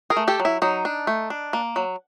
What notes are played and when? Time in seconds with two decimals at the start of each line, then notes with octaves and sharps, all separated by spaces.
0.10 G#4 A#4
0.17 A3
0.28 G4 A4
0.40 F#3
0.45 E4
0.62 F#3 D#4
0.85 D4
1.07 A3
1.30 D4
1.53 A#3
1.76 F#3